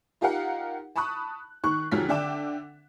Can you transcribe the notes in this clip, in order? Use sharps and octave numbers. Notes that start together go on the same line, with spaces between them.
D#4 F4 G4 A#4 F5 F#5
A5 B5 C#6 D#6 F#6
D#3 C#6 F#6
F1 D#3 F3 F#3 F6 B6
D3 D4 E5 G5 D6 E7